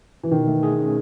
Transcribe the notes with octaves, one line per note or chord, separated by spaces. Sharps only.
E3
B2 D#3
A3
G#4
C#4